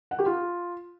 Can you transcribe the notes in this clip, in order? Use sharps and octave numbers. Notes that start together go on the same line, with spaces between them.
F#5
G4
F4